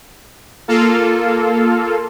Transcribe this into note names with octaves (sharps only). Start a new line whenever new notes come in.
A#3 F4 A4 F5